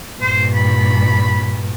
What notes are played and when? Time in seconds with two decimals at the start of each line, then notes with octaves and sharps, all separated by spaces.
0.21 G2 A#2 C5
0.54 B5